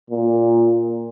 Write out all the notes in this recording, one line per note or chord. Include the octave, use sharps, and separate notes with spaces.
A#2